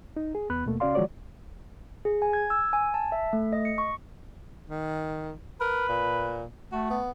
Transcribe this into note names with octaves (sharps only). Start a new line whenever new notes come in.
D#4
G#4
E2 B3 B5 F#6
D#2 B2 A3 A#3
C#3 C#4 F#4 D5 F5 C6
D#3 F3 G#3 F#4 C#5 D5
G#4
G#5
G#6
E6
G#5
A5
E5
A3
D#5
C#7
C#6
D#3
A#4 B4
A#2
A3 F#4
B3